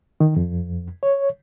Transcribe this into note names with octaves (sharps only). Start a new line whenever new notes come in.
D#3
F2
C#5